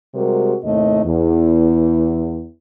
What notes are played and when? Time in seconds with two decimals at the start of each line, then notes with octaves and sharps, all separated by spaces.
0.14 C3 G3 G#3 F#4 A#4
0.64 D#2 A2 C3 A3 D#4 D#5
1.04 E2